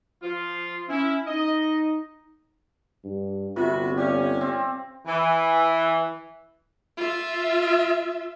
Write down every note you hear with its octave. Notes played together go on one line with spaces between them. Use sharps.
F3 F4
C#4 E4
D#4 D#5
G2
G1 C3 F4 F#4 B4
C#4 G4 D5 F5
C4
E3
F4 E5